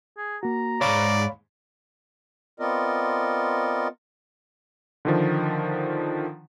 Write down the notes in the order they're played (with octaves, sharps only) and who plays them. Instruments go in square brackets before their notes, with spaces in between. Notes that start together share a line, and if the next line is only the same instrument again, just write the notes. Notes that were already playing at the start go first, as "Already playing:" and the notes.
[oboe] G#4
[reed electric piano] A#3 F#4 [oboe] A#5
[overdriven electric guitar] C2 G#2 [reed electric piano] C#5 F5 B5 [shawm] D5
[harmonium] B3 C4 F4 A#4 D5 D#5
[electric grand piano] D3 D#3 F3